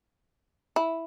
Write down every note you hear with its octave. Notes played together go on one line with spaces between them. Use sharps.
E4